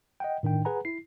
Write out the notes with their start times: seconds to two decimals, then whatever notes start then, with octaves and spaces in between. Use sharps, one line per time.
0.20 D#5 F#5 G5
0.43 A2 D#3 D4 G5
0.65 G#4 B4 F#5 G#5 A#5
0.85 E4 C7